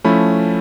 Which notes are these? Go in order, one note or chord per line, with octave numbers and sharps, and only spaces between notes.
F3 A3 C#4 E4 B5